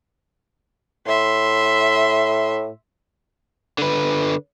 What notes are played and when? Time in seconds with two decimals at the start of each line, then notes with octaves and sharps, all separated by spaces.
1.07 A2 E5 C6
3.78 D3 B4